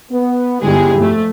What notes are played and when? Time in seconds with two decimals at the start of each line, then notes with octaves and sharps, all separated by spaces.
0.11 B3
0.62 G1 G#3 E4 G4 G#4
0.98 F2 A3